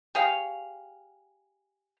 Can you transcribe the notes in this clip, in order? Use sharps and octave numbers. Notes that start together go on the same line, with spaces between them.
G4 G#4 C#5 F5